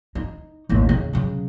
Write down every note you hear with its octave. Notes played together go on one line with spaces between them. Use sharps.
D#4
A1 D#2
C#3
C#3 F#3